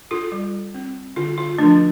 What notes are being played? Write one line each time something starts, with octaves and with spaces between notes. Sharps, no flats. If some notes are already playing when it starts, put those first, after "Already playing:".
F4 A4
G3
C4
D3 F4
F4
F3 A3 D4